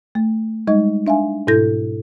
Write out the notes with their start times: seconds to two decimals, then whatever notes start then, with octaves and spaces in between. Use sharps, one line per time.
0.15 A3
0.67 G3 G#3 D#4 D#5
1.07 D4 E5 F5 G#5
1.47 G#2 B2 E4 A4 G6 A#6